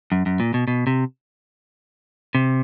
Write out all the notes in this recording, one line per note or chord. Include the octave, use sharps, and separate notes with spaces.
F#2
F#2
A#2
B2
B2
C3
C3